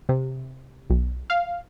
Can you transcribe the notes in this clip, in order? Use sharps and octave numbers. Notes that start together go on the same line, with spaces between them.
C3
B1
F5